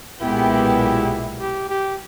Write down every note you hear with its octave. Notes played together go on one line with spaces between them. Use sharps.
B1 A#2 G#3 B3 E4 G4
G4
G4